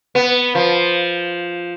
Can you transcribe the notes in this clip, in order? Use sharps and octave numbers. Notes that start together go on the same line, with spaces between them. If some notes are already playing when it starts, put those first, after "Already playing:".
B3
F3